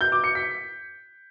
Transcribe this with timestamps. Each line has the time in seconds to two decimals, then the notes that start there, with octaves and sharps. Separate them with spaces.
0.01 G6
0.12 D6
0.24 C#7
0.35 B6